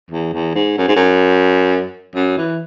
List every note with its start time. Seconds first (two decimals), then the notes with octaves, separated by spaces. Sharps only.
0.11 E2
0.33 E2
0.55 G#2
0.78 F#2
0.88 G#2
0.96 F#2
2.15 F#2
2.38 E3